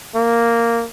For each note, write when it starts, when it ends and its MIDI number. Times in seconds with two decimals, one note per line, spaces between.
0.15 0.86 58